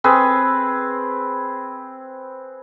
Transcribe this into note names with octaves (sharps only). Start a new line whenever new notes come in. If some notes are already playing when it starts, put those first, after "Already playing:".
C4 G#4 B4